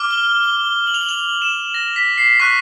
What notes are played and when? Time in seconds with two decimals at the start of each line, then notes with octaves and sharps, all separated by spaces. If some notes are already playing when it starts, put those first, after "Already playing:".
Already playing: D6 F6
0.11 G7
0.43 G7
0.65 G7
0.87 F#7
0.94 F7
1.01 F#7
1.09 F7
1.42 E7
1.74 A#6
1.96 B6
2.18 C7
2.40 C#6 F#6 B6